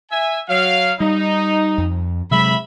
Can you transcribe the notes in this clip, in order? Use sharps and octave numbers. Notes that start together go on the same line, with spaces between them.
E5 G#5
F#3 F5
G3 D#4
F2
C3 F#3 G#3 E5 B5